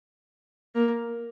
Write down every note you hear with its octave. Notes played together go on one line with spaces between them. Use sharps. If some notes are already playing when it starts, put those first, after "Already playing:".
A#3